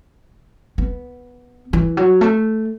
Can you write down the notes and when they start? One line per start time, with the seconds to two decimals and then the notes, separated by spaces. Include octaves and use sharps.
0.78 B3
1.73 E3
1.97 F#3
2.21 A3